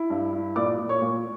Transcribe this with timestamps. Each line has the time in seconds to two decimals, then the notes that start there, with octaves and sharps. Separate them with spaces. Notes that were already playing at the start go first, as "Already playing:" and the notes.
Already playing: E4
0.10 G2
0.33 E4
0.56 A#2 D5 D6
0.78 A#2
0.89 C#5 C#6
1.01 A#2